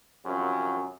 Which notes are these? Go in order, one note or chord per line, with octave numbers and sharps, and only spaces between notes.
F#2 C3 D#3 F3